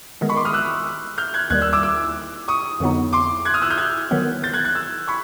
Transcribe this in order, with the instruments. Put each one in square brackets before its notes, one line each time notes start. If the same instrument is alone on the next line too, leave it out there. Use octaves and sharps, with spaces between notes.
[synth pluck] D#3 G#3 B3
[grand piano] B5 C#6
C6 D6
D#6 F6
E6 F#6
F6 G6
F#6 G#6
[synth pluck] D#2 D#3 G3 [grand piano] F#6 G#6
[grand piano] E6 F#6
D6 E6
D6 E6
C#6 D#6
[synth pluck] F2 D3 F#3 B3 D#4
[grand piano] C6 D6
F#6 G#6
D#6 F6
E6 F#6
F6 G6
F#6 G#6
[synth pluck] D#3 F#3 B3
[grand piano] G6 A6
F#6 G#6
F#6 G#6
E6 F#6
B5 C#6